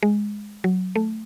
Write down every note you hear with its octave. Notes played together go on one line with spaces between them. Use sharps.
G#3
F#3
A3